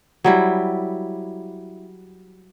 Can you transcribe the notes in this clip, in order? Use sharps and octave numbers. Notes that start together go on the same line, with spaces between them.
F#3 G3 E4